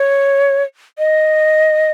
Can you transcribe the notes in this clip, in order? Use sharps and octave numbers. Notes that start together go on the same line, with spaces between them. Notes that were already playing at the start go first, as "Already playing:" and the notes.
Already playing: C#5
D#5